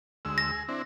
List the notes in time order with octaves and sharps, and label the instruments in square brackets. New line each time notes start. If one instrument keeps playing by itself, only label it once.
[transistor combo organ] D2 G#3 E6
[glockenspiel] A#6
[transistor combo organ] G#4
C4 D4 E4